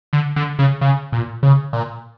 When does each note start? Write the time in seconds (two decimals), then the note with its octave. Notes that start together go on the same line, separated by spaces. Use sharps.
0.13 D3
0.36 D3
0.59 C#3
0.81 C#3
1.12 A#2
1.43 C#3
1.73 A#2